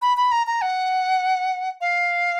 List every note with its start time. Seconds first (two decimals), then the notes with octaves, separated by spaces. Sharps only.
0.02 B5
0.17 B5
0.32 A#5
0.47 A#5
0.62 F#5
1.81 F5